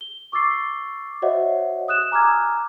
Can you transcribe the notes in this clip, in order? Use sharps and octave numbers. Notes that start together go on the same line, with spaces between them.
G7
C#6 D6 E6 A6 C7
F#4 C5 C#5 D#5 E5 F#5
D#6 F#6 E7
G#5 A#5 D6 E6 F6 G#6